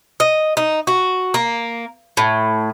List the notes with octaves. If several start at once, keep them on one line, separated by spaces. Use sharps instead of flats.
D#5
D#4
F#4
A#3
A2